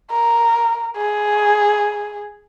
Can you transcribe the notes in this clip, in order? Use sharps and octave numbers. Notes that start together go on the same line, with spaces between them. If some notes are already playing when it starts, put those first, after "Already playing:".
A#4
G#4